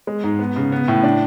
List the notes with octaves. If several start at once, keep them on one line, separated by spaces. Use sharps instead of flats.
G#3
G#2
B3
C#3
B3
A2
D4